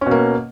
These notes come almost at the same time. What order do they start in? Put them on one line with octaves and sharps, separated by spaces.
C#4 B2 A#3